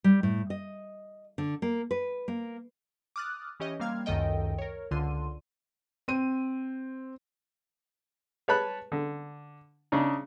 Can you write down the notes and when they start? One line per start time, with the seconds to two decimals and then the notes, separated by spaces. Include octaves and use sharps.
0.04 G3
0.23 A2
0.50 D#5
1.38 D3
1.62 A#3
1.91 B4
2.28 A#3
3.16 D6 D#6 F6 F#6 A6
3.60 E3 C#4 G4 C#5 D#5
3.80 G3 A#3 C4 F5 F6 G#6
4.06 C#2 F#2 D#3 A4 D#5 G5
4.58 A#4 C#5
4.91 C#2 D3 F4 C6 D#7
6.08 C4 D#7
8.48 B4 C#5 A5 B5 F#6
8.92 D3
9.92 C#3 D4 D#4